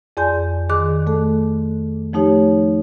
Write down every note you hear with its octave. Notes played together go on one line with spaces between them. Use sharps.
F2 G#4 D5 G#5 C6 G6
D#3 G#4 C6 D6 F#6
A3 A4
F3 A3 D#4 G4 C#5